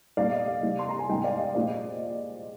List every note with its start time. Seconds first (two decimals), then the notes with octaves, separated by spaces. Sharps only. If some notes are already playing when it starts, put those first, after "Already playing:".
0.17 A#2 G3 D5 F5
0.32 D#5
0.48 D#5
0.63 C3 G3
0.79 C6
0.89 A#5
0.99 G#5
1.09 G#2 G3 D#5 G5
1.24 D5 F5
1.39 D#5
1.55 A#2 F3 G#3 D5
1.70 D#5